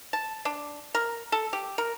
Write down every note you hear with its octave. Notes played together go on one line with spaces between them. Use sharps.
A5
D4
A#4
A4
G4
A#4